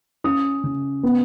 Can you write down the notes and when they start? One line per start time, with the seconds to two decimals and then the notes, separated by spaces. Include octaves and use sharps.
0.24 C#4 D#6
0.64 C#3
1.03 B3